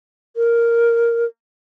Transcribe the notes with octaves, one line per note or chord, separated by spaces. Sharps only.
A#4